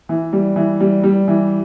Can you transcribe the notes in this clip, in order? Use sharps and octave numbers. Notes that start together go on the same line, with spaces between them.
E3
G3
E3
G3
G3
E3